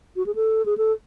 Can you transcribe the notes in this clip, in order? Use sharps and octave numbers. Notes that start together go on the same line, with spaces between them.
F#4
G#4
A4
G#4
A4